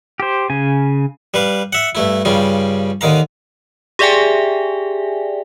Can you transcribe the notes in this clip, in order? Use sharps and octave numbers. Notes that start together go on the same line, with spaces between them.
G4 C5
C#3 G#5
G3 B4 F5
E5 F#5
G2 A3 E4
G2 C#3 G3 F4
D#2 D3 D#3 F5 A#5
G4 G#4 D5 E5 G5 G#5